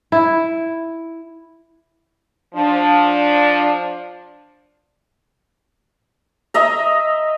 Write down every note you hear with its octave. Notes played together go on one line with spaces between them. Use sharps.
E4
F3 D4
D#5 E5 A#5